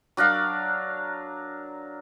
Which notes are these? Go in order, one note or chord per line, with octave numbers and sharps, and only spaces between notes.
F#3 D4 A#4 F5